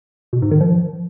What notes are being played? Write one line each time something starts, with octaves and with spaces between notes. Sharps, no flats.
B2
G#2
D#3
F3